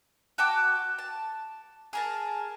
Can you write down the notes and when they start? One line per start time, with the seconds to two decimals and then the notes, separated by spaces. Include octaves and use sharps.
0.38 F#4 G5 A5 D6
0.98 A5
1.93 G#4 A#4 A5